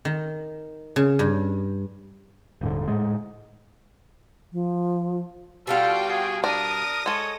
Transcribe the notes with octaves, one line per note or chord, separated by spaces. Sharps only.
D#3
C#3
G2
D#1 G#2 D3
A2 G#3
F3
B2 G3 F4 F#4 A4 F5 G5
G#4
D4 A#4 D#6 A#6
G#3 A4 C#5